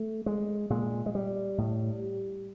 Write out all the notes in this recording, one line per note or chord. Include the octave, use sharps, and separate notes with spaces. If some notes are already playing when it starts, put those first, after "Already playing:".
Already playing: A3
G#3
A#2 G#3
G#3
G3
A2